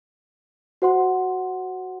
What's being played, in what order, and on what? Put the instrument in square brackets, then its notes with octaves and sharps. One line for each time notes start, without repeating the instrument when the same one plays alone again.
[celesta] F#4 C5 F#5 C6